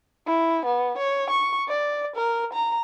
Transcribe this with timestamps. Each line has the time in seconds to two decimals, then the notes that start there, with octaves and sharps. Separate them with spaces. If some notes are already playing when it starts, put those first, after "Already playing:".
0.27 E4
0.66 B3
0.98 C#5
1.30 C#6
1.68 D5
2.16 A#4
2.53 A#5